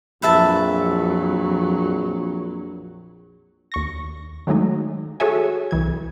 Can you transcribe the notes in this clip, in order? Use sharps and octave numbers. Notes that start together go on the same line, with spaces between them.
A#1 F2 F#3 B4 E5 A5
D#2 C#6 A#6
D#3 F#3 G#3 A3 D#4
F#4 G#4 A4 C#5 E5 G#5
C2 E3 G#6